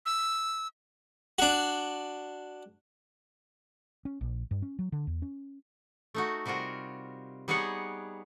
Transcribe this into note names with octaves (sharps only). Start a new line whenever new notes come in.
E6
D4 F#4
C#4
A#1
G2
C#4
F#3
D3
E2
C#4
A3 D#4 F#4
C3 G3 F4 F#4 A#4
G3 B3 D#4 G#4 C#5 F#5